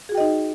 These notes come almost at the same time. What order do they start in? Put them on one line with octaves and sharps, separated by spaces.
G#4 F#4 G5 D#5 D#4